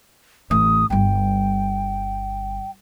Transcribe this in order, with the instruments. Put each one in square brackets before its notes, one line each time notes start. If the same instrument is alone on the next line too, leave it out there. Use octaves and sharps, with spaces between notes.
[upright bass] A1 [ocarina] D#6
[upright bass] G1 G3 [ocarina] G5